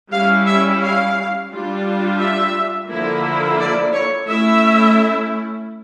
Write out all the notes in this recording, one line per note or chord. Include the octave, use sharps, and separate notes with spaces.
G3 C#4 E4 F5
E5
F5
G3 D4 F4
E5
D3 F3 A#3 E4
D5
C#5
A3 C#4 E4 E5